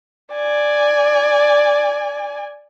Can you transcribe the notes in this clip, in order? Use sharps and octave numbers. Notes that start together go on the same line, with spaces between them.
D5 G#5